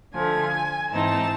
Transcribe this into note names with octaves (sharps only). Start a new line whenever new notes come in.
D3 F3 A3 G#5
G#2 E3 G#3 C4 D#4 A5